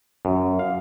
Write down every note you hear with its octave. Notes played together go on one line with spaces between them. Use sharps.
F#2
F5